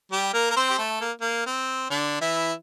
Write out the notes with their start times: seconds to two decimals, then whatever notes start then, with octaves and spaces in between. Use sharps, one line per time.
0.11 G3 G4
0.33 A#3 A#4
0.50 A#4
0.56 C4 C5
0.70 G4
0.78 A3 A4
1.01 A#3
1.21 A#3
1.46 C4
1.90 D3 D4
2.21 E3 E4